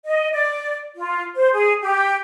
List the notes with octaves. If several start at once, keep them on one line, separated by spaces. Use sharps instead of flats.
D#5
D5
F4
C5
G#4
G4